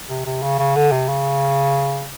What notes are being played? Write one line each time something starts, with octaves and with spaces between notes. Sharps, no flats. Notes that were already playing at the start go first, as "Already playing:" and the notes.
C3
C3
C#3
C#3
D3
C3
C#3